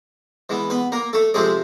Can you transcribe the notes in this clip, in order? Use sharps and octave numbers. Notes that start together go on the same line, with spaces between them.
E3 G#3 B3
B3 B4
A#3 A#4
A3 A4
C3 F3 G#3 A3 C4 G#4